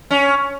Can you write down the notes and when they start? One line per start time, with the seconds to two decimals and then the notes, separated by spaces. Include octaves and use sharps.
0.11 C#4